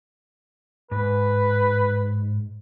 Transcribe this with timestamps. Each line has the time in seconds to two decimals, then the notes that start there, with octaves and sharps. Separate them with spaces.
0.91 G#2 B4